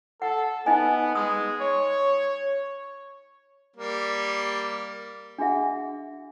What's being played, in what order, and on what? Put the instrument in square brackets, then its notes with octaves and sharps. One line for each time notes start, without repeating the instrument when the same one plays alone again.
[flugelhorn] A4 [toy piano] F#5
[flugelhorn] B3 [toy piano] D#4 D#5 G#5
[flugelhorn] G#3 [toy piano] D#6
[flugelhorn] C#5
[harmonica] G3 A#3
[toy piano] D4 F#4 G#4 E5 F#5